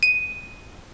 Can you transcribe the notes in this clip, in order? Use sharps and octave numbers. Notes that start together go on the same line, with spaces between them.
D#7